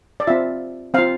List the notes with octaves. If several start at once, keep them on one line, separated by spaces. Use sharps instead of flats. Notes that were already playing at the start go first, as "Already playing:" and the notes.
D5
C4 F4 E5
C4 F4 F5